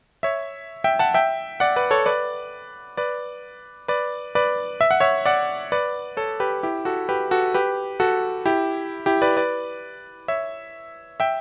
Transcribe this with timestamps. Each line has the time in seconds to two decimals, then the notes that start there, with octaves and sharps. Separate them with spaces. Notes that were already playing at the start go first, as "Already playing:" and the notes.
0.23 C#5 E5
0.84 E5 G5
0.99 F#5 A5
1.14 E5 G5
1.60 D5 F#5
1.76 B4 D5
1.91 A4 C#5
2.06 B4 D5
2.97 B4 D5
3.88 B4 D5
4.35 B4 D5
4.81 E5
4.91 F#5
5.00 C#5 E5
5.26 D5 F#5
5.72 B4 D5
6.17 A4 C#5
6.40 G4 B4
6.63 E4 G4
6.85 F#4 A4
7.09 G4 B4
7.31 F#4 A4
7.54 G4 B4
8.00 F#4 A4
8.45 E4 G4
9.06 E4 G4
9.22 B4 D5
9.37 B4 D5
10.28 C#5 E5
11.20 E5 G5